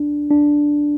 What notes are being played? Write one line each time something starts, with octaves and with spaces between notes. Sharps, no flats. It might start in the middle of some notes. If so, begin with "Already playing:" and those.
Already playing: D4
D4